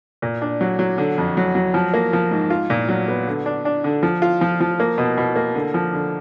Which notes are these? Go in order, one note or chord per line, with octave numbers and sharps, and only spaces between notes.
A#2
D4
F#3
F#3
D3
F2
F#3
F#3
F3
A#3
F3
G#2
F4
A#2
F#3
B3
D3
D4
D4
D3
F3
F4
F3
F3
A#3
B2
B2
A#3
D3
F3
D3